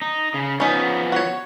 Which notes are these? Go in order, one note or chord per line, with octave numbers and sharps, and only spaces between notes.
D#4
C#3
F3 B3 C#4 D#4
F#4 C#5